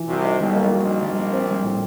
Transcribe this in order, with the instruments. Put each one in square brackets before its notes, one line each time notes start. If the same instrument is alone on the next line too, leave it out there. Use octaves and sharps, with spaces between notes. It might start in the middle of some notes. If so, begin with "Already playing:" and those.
Already playing: [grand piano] E3
[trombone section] C2 C3 [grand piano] F#4
[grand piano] D#4
[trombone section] B1 B2 [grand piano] G3
[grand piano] A#3
[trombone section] A#1 A#2 [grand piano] F#4
[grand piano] D#4
G3
A#3
C4
G3
A2